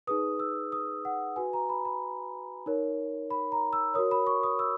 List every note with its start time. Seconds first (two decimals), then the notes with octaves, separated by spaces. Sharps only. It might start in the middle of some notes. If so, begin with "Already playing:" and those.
0.07 D#4 G#4 B4 D#6
0.40 E6
0.72 D#6
1.05 F#5
1.36 F#4 B4 G#5
1.53 A#5
1.69 B5
1.85 B5
2.66 D#4 A#4 C#5
3.30 B5
3.52 A#5
3.73 E6
3.94 F#4 A#4 C#5 D#6
4.11 B5
4.27 C#6
4.43 D#6
4.59 E6